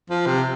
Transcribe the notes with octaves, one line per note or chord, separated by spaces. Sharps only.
F3
C3